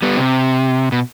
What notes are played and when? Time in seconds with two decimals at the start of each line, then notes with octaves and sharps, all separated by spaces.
0.02 G3 B3
0.17 C3
0.92 B2